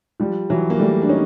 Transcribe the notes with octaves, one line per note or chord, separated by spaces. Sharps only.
F3 G3
E3 F#3
A#3
G3 A3
D4
C#4 D#4